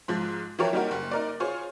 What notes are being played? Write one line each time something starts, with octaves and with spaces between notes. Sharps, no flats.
G#2 F3
E3 F3 E4 G4 A#4 C#5
G3 A#3 D#4 F#4 G4 A#4
F#1
D#4 A#4 D5
F4 G#4 C5 C#5